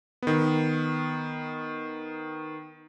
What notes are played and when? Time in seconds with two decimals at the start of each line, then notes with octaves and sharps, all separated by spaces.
0.23 D#3 B3